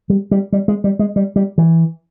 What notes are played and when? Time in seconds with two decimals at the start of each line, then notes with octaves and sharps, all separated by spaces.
0.10 G3
0.31 G3
0.53 G3
0.68 G#3
0.84 G3
0.99 G#3
1.16 G3
1.36 G3
1.58 E3